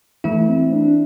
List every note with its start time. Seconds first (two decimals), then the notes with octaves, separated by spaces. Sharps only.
0.24 E3 A3 E4
0.49 C4
0.72 D4